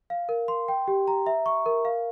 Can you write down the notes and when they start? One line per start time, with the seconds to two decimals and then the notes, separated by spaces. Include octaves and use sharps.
0.10 F5
0.29 A#4
0.48 C6
0.68 G5
0.88 G4
1.08 A#5
1.26 E5
1.46 C#6
1.66 A#4
1.85 F5